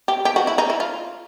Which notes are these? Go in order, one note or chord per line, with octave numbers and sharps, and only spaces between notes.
G4
G4
F#4
E4
D#4
E4
F4